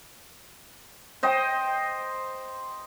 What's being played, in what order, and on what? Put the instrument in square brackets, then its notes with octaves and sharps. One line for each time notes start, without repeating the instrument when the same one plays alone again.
[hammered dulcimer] C5 D#5 G5